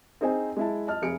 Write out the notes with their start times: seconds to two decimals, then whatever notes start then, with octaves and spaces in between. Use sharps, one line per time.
0.21 C4 D#4 G#4 C5 G#5
0.57 G#3 E4 A5
0.87 D#5 A5 F6
1.02 F1 G#4 C#7 D7